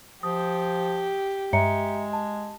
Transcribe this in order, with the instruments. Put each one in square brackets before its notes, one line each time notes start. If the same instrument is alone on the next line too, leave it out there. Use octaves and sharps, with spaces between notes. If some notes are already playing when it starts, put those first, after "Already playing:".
[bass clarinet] F3 [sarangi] G4 [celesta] D#6
[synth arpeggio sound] G2 [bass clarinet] G#3 [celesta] E5 A#5 C#7
[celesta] A5